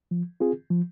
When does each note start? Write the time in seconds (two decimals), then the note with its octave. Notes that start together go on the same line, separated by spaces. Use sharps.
0.11 F3
0.40 C4 F4 G#4
0.70 F3